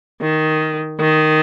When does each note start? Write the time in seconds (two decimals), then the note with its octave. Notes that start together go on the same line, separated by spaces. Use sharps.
0.21 D#3
1.00 D#3